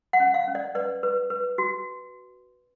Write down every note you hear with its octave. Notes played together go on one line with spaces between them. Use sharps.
F#5
C#4
F5
C#4
D5
B4 D5
B4
B4
F#4